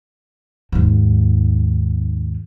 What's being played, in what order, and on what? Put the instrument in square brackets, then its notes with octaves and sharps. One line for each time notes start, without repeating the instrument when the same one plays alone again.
[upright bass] D#2 G#2